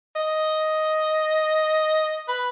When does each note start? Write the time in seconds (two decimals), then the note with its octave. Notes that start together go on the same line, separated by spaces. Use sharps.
0.16 D#5
2.28 B4